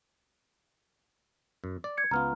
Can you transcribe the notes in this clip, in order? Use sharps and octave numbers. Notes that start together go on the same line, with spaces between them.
F#2
D5
G#6 C#7
C#2 B3 F4 A#5 F6